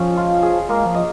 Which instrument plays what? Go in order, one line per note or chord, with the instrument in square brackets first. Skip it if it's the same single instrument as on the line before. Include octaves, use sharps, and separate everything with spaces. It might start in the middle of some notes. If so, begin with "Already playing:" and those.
Already playing: [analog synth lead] F3 [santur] C#4 G#4 D#5
[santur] F4
G#4
[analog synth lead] G#3 [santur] A#3
[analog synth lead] F3
[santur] D#5